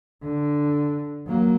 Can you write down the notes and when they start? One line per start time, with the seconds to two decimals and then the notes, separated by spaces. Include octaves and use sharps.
0.23 D3
1.27 F#3 A#3